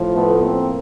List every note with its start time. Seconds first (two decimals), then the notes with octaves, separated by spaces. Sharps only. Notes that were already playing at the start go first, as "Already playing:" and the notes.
Already playing: A2 F3
0.15 A3 B3
0.44 A#3 C4